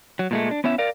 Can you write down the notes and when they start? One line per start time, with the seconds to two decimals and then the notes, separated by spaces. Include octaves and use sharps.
0.19 F#3
0.31 A#2 G#3 A3
0.51 D4
0.64 B3 C#4 E4 E5
0.78 A#4 D5 F5